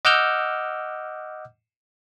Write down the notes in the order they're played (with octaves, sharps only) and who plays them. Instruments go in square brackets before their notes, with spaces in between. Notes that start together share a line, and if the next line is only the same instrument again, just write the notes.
[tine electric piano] D#5 F#5 D6 E6 F6 G6